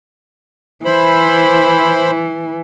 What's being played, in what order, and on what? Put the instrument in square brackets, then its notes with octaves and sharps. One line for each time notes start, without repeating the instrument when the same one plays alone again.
[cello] E3 [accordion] E4 C5 B5